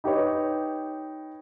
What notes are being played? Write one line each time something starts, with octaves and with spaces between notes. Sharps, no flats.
D#4 G4 B4 C#5